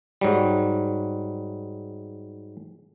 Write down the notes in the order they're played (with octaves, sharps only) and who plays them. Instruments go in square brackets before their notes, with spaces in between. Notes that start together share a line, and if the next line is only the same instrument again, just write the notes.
[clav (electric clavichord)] G#2 F#3 G3